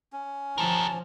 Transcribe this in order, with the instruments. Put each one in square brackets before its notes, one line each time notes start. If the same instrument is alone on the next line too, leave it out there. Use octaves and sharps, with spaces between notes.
[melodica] C#4
[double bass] F3 [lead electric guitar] G4 A#4 [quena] A5